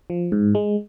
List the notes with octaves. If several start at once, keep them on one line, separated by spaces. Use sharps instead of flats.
F3
G#2
G#3